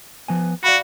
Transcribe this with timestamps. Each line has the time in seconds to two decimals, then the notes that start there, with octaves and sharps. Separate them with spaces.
0.28 F3 B3 G#5
0.64 F#4 D5 F5 B5